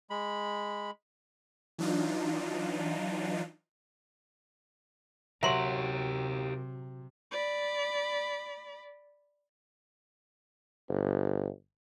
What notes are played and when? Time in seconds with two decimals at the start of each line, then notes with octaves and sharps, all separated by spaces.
0.10 G#3 B5
1.79 E3 F#3 D4 D#4 F4
5.43 C3 F#3 G4 A#4 E5 C6
7.31 D5 B5
10.89 G1